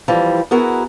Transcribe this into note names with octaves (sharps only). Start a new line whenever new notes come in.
E3 F3 G3
B3 E4 F#4 G#4 A#4